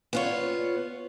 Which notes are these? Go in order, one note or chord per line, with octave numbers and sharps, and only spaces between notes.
B3 F4 C#5